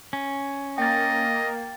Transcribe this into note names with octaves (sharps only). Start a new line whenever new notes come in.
C#4
A#3 D#5 G5 A6